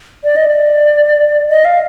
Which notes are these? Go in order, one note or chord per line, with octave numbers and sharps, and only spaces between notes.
D5
D#5
D5
D#5
F5